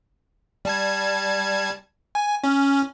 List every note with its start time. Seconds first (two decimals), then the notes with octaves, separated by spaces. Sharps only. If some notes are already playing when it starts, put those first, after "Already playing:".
0.65 G3 A5 G#6
2.15 G#5
2.44 C#4